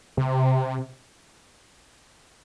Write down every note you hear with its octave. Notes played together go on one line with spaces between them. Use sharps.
C3